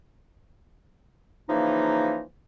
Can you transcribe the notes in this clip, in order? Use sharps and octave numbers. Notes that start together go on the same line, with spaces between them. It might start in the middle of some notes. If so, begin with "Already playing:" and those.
C#3 E3 F3 A#3 D#4